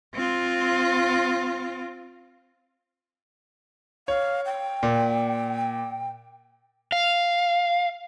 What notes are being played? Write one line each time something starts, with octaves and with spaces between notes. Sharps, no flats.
C4 F4
C#5 F5
G5
A#2
F5